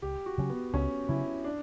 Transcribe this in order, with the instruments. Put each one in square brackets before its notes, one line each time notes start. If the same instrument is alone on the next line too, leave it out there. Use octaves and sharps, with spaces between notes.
[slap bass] C#2 [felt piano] G4
[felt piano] F#4
[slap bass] C#3 F#3 C#4
[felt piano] B3
[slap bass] C#2 [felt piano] C#4
[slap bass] C#3 F#3 C#4 [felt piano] E4
[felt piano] D4